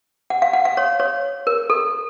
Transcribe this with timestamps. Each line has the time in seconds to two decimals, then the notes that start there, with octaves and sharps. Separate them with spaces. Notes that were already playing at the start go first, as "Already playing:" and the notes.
0.30 F#5
0.42 F5
0.53 F#5
0.65 F5
0.77 C#5
1.00 C#5
1.47 A#4
1.70 A4